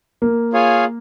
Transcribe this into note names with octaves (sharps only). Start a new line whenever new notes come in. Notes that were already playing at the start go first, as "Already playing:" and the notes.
A#3
F4 G#4 C#5 F5 G#5